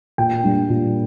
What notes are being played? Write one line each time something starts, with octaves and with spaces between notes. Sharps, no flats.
A#2 G5
G3 D4
A#2